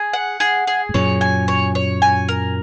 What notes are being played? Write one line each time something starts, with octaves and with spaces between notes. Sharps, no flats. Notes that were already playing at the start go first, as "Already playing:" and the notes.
Already playing: G#4
F#5
G#4
G#4
G#2
F#2 A#2 C#5
G#5
C#5
C#5
G#5
A#4